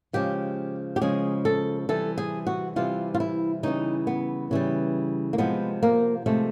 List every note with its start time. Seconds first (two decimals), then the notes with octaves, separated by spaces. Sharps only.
0.13 C#3 F3 G#3 G4
0.96 G4
1.01 C#3 F3 G#3 G#4
1.45 A4
1.89 C3 E3 G3 A4
2.18 G#4
2.47 F#4
2.76 C3 E3 G3 F4
3.14 F4
3.20 E4
3.63 C#3 E3 G3 D#4
4.07 B3
4.51 C#3 E3 G3
5.33 A#3
5.38 C3 F3 G#3 B3
5.83 A#3
6.26 C3 F3 G#3 A3